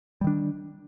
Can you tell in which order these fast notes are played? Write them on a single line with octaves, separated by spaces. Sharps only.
G3 D#3 D4